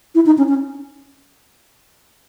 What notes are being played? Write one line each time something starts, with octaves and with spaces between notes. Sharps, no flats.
E4
D#4
C#4
C#4